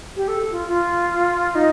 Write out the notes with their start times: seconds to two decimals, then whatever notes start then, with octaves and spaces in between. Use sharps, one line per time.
0.16 G4
0.28 A4
0.51 F4
0.69 F4
1.55 D#4